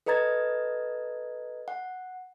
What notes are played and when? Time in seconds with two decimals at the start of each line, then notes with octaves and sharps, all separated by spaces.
0.06 A4 B4 D#5 A#5 G#6 A6
1.68 F#5